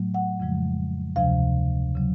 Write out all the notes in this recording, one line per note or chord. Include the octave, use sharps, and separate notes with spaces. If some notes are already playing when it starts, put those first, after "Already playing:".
Already playing: A2 F#3 A3
F#5
F2 C#3 F3 G#3
D2 C3 F3 F5
C#3 F#3